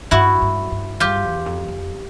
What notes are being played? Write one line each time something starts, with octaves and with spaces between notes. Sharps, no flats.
G2 E4 F#4
G2
G2
G2 F4 G4
E2
F2
F2